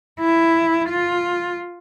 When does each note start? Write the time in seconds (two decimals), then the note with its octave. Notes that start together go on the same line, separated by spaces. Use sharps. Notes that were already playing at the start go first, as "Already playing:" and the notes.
0.20 E4
0.89 F4